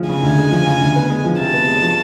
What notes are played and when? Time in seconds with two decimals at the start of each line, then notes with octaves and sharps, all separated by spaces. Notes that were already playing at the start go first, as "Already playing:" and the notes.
Already playing: D2 F3 G#3
0.09 C#3 G#5
0.23 D2
0.38 G#3
0.51 F3
0.66 C#3
0.81 D2
0.95 B3
1.10 G#3
1.25 F3
1.39 C3 A5
1.53 B3
1.68 G#3
1.82 F3